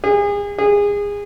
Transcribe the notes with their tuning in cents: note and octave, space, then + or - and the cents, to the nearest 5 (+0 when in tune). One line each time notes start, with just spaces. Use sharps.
G#4 -35
G#4 -25